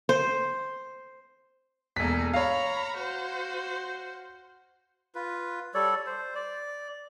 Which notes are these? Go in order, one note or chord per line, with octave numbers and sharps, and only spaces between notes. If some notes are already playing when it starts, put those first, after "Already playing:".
C5
E1 A#3 G#4 A4 B6
C#5 F5 A#5 B5 C#6
F#4 C5
F4 B4
G3 A4 C#5 D5
C5
D5